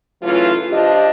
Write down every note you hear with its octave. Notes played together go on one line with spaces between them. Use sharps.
C#3 E3 F#3 A3 F4
F3 D4 F4 G4 D#5